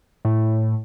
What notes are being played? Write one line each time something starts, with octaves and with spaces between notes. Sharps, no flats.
A2